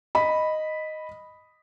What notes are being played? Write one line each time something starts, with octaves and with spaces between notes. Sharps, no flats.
D#5 B5